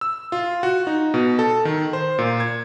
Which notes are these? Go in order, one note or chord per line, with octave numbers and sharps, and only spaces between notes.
E6
F4
F#4
D#4
B2
A4
D#3
C5
A#2
G#6